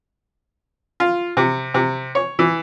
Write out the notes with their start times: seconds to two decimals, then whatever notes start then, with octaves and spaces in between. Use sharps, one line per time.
1.00 F4
1.37 C3
1.74 C3
2.15 C#5
2.39 E3